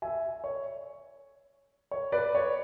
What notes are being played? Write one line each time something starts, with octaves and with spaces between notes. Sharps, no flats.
E5 G#5
C#5
C#5
B4 D5
C#5